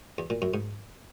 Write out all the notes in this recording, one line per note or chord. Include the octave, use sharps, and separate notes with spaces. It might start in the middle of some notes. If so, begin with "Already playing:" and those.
E2
A#2
F#2
G#2